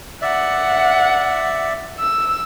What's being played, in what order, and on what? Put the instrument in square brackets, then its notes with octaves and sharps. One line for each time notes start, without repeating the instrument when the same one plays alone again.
[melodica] D5 E5 [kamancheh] F#5
[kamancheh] E6